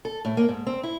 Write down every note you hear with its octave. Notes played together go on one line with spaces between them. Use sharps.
A4
A2
A#3
G#2
C4
E4